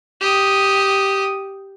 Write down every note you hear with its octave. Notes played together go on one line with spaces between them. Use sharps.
G4 D#6